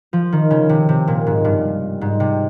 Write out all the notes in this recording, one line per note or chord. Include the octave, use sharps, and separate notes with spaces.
F3
D#3
C#3
C3
C3
A#2
G#2
G2
G#2
C3